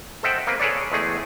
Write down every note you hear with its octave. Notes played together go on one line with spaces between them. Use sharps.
A4 C5 D#5 E5 F#5 G5
A#3 C4 B4
G#4 A4 B4 C#5 D5
E2 G#3 A3 G#4